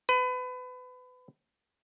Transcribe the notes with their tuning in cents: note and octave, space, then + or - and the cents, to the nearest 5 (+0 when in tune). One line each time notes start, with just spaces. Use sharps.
B4 +30